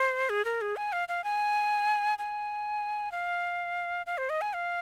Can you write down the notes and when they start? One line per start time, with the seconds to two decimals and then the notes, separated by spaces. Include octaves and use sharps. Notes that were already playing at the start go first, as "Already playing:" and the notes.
Already playing: C5
0.29 G#4
0.45 A#4
0.61 G#4
0.76 G#5
0.93 F5
1.08 F5
1.24 G#5
2.19 G#5
3.12 F5
4.06 F5
4.18 C5
4.30 D#5
4.41 G#5
4.53 F5